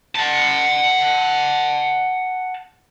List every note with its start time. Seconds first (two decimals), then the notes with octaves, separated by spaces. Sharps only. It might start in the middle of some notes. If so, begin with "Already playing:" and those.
0.16 F#5 A5